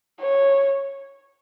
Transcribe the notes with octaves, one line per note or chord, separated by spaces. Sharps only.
C#5